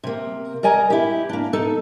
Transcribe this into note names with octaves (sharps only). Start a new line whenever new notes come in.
C3 A#3
A#4 D5 D#5 G#5 A#5
E4 G4
A#3 D4
D#4 A4